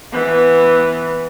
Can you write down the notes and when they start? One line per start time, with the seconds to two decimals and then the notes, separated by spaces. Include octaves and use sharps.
0.12 E3 B3